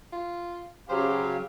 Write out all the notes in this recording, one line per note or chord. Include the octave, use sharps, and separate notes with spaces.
F4
C#3 F#3 G4 C5 F5